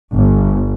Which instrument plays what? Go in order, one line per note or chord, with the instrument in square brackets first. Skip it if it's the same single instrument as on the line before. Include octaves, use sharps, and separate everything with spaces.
[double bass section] G1